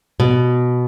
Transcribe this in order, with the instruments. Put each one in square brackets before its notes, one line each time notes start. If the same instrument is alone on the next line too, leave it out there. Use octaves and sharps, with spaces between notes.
[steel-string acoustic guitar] B2